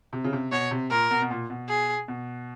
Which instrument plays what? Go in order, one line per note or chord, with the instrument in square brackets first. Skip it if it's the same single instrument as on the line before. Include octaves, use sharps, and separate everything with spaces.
[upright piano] C3
C#3
C3
[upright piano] B2 [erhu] C#5
[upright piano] C3
[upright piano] A#2 [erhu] A#4
[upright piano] B2
B2
A#2
B2
[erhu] G#4
[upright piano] B2